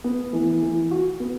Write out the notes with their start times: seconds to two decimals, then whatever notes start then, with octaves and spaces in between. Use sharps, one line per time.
0.04 B3
0.33 E3
0.62 E3
0.91 F#4
1.20 B3